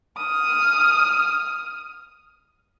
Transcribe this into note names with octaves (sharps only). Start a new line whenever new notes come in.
D#6 F6